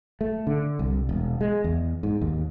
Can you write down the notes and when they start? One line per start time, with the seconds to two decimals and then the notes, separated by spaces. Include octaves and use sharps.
0.21 A3
0.47 D3
0.79 C2
1.09 E1
1.41 G#3
1.64 E2
2.03 G#2
2.21 D#2